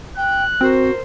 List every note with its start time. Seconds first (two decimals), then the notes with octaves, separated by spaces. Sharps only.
0.17 G5 F#6
0.61 C4 F#4 A#4 C5